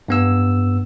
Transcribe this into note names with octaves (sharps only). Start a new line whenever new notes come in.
G2 B3 E6